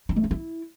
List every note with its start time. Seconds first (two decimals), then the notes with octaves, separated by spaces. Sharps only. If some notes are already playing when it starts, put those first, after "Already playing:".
0.09 D#4
0.16 A3
0.24 C#4
0.31 E4